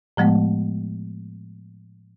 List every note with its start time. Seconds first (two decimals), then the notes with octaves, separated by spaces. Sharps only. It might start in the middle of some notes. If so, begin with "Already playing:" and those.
0.17 A2 F3 G#3 A3 B3